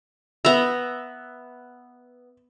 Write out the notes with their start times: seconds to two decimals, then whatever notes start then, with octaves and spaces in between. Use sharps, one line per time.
0.45 B3 E5 A#5